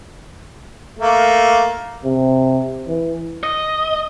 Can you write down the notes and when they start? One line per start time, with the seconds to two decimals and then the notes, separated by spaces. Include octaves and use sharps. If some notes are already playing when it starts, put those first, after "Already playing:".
0.99 A3 A#3
2.04 C3
2.88 E3
3.43 D#5